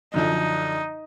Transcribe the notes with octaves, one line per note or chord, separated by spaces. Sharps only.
F#2 D3 F3 D#4